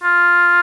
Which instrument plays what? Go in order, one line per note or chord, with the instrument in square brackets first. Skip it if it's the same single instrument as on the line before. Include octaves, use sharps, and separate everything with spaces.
[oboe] F4